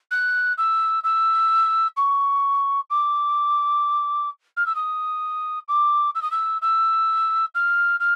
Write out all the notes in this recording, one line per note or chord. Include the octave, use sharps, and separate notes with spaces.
F#6
E6
E6
C#6
D6
F6
E6
D#6
D6
E6
D#6
E6
E6
F6
F6